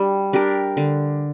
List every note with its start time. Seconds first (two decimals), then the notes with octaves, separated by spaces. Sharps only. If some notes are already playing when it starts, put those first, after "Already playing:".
Already playing: G3 D4
0.33 D4 G4 A#4
0.77 D3